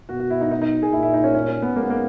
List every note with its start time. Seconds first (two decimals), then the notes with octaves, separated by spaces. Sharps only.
0.09 B2 F#4
0.20 F#4
0.30 E4
0.41 D#4
0.51 D#4
0.62 D#4
0.83 G#4
0.92 A#2 E4
1.03 E4
1.14 D#4
1.24 C#4
1.34 C#4
1.48 C#4
1.62 B3
1.76 G#2 A#3
1.83 B3
1.90 A#3